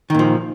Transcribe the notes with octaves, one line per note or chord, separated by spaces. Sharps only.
A#2 D#3 F3